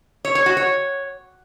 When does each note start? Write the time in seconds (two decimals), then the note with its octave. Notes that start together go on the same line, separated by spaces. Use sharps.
0.25 C#5
0.35 C#5
0.46 F#4
0.57 C#5